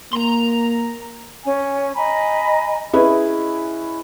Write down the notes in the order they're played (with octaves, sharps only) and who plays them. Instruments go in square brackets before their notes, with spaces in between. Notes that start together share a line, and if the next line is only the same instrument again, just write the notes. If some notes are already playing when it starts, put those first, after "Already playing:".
[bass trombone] A#3 [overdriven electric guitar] A#5 C6
[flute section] C#4 G#5
D#5 G#5 A#5 B5
[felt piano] C#4 E4 G#4 B4 D#5